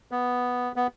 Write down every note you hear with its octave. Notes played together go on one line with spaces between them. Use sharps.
B3
B3